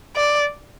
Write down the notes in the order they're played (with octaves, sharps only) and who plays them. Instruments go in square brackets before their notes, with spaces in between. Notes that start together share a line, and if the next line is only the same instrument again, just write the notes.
[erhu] D5